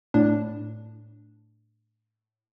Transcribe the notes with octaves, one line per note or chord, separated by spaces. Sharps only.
A2 D4